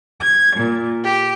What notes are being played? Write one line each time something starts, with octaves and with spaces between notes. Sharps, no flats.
G#6
A#2
G4